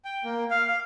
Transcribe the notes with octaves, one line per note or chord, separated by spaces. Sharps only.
G5
A#3
F5
F5